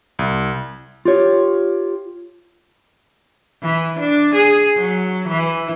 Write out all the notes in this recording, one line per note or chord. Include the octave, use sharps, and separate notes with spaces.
C2
F4 G4 C#5
E3
D4
G#4
F#3
E3